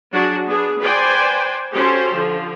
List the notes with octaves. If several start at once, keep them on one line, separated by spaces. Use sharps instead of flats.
F#3 D4 F#4 G#4
B3 D4 G#4
B4 C5 D5 G5 G#5
C#4 F#4 G4 A4 C5
D3 F3